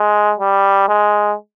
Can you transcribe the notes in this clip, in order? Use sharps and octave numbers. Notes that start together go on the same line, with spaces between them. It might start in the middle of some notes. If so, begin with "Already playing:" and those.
Already playing: G#3
G3
G#3